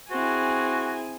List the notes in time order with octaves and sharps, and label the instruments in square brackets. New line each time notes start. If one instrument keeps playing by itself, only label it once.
[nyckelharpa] C4 E4 [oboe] F#4 [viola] G#4 G#5